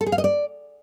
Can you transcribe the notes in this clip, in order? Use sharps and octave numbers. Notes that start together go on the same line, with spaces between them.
A4
G#4
F5
D#5
D5